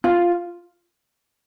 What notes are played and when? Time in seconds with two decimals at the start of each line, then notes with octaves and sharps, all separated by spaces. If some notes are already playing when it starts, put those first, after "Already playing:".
0.04 F4